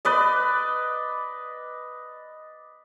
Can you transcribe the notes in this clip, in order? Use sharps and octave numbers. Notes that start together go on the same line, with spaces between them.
B4 D5 D#5